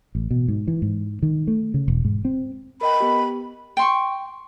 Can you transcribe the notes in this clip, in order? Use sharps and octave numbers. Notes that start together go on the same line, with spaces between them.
A1
B2
G#2
E3
G#2
D#3
A3
C#3
E1
G#2
C4
A#4 D#5 G5 B5
B3 G4
G5 C6 C#6